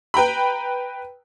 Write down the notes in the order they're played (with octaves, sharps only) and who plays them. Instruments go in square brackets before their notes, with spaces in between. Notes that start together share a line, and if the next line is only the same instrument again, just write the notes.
[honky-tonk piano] B4 G5 A#5 B5